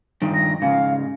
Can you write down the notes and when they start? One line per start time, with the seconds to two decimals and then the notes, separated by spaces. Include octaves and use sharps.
0.22 G2 D#3
0.34 A#6
0.62 G#2 C#3 F5